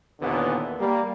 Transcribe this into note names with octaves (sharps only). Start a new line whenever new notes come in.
D#2 A#2 D3 E3 B3
G3 A#3